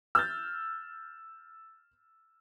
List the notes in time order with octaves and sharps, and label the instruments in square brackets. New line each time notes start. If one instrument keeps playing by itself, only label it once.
[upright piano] E6 F6 G6 A6